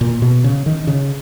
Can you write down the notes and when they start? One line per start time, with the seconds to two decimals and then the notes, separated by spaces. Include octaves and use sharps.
0.01 A#2
0.22 B2
0.44 C#3
0.66 D#3
0.87 C#3